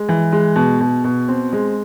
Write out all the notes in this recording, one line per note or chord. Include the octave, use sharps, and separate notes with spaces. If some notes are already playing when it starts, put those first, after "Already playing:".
Already playing: G#3
E3
G#3
B2
B2
B2
C4
G#3